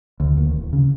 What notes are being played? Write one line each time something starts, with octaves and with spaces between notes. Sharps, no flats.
D2
D#2
D1
C#3